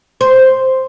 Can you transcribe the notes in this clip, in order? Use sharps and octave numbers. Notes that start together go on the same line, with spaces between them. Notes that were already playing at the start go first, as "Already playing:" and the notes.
C5